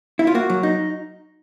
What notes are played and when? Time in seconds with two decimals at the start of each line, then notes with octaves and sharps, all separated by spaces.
0.19 E4
0.27 F4
0.35 A#3 F#4
0.50 F#3
0.63 D#4